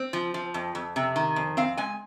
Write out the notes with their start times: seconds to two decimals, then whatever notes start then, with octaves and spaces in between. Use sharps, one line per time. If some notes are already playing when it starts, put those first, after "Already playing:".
Already playing: C4
0.13 F3
0.34 F3
0.54 F2
0.75 F2
0.96 C3
1.16 D#3
1.36 F2
1.57 C4 F5
1.77 G#3 G#5